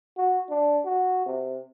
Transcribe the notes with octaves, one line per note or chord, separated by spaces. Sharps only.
F#4
D4
F#4
C3